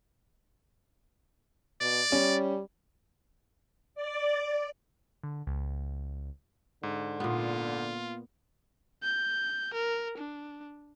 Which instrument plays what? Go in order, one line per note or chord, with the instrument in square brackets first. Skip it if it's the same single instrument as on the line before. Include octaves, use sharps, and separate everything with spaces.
[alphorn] B2 [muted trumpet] D5
[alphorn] G3 [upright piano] C#4
[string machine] D5
[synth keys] D3
C#2
[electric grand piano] G#2 [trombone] D3
[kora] A#2 B3 [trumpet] F4
[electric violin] G6
A#4
D4